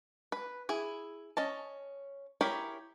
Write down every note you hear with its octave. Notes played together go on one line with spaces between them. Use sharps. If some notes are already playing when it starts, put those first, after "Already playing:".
B4
E4 G#4
C#4 D#5 A5
E4 G4 G#4 A#4 C#5